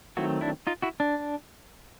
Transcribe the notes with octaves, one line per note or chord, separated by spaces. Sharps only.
D#3 F#3 A3 C4 E4 F#4
D4 E4
D#4 F4
E4 F#4
D4